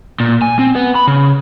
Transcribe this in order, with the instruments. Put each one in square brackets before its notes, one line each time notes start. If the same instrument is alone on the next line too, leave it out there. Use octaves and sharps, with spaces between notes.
[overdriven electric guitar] A#2
G#5
C4
B3
B5
C#3